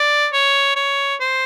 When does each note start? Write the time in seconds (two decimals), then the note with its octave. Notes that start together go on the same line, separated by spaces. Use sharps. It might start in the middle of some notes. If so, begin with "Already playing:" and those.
Already playing: D5
0.33 C#5
0.76 C#5
1.20 C5